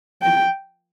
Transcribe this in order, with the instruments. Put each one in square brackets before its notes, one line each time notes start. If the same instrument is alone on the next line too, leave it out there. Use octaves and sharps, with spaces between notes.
[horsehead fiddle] G5